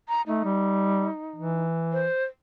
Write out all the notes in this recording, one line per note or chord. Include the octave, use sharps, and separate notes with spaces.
A#5
A3 D#4
G3
E3
C5